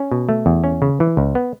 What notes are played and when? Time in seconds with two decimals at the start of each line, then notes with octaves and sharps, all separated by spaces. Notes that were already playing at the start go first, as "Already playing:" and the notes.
Already playing: C#4
0.12 B2
0.29 A3
0.46 E2
0.64 C#4
0.82 C#3
1.00 E3
1.17 C#2
1.35 B3